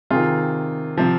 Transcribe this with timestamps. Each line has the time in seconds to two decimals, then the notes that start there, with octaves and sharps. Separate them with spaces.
0.10 C3 D#3 F4 G#4
0.98 C3 F3